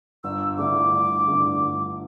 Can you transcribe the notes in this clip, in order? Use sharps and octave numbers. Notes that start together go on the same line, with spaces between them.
G1 E6
G2 D3 A3 E4 D6
G1
G2 D3 A3 E4
G1